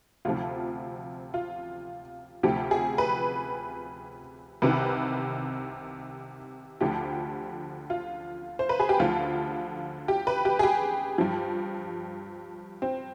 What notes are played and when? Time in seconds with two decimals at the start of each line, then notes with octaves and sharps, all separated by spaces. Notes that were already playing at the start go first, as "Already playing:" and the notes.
0.25 D2 C3 F3 F4
1.34 F4
2.43 D2 C3 F3 G4
2.71 G#4
2.98 B4
4.62 C2 C3 D#3 B4
6.81 D2 D3 F3 G4
7.90 F4
8.59 C5
8.69 B4
8.80 G#4
8.89 G4
8.99 D2 D3 F3 F4
10.08 G4
10.27 B4
10.45 G4
10.59 G#4
10.63 G4
11.18 G2 F3
12.82 C4